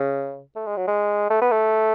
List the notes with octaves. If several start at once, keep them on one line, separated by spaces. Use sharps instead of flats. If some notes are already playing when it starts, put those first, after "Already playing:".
Already playing: C#3
A3
G#3
F#3
G#3
A3
B3
A3